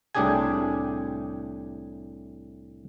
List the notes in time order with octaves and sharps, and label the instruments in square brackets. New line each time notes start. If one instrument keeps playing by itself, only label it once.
[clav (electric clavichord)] C2 A2 D4 G4 G#4 G#5